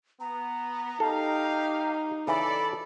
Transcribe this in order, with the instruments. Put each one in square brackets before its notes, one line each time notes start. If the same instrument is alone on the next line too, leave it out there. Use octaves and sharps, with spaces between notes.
[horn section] B3 [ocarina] A#5
[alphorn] D#4 [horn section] G4 F5 [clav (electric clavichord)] A4
[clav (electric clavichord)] C#3 E3 [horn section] A4 D5 [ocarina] B5